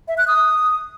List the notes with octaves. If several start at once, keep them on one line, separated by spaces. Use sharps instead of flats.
E5
F#6
D#6